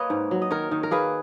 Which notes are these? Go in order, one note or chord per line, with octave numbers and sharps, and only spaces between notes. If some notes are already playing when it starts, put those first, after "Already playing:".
Already playing: A#3 B4 C#5 D#5
G#2
F#3
D#5
D#3 A#4 C#5
D#3
A#4
A#3 G#4 B4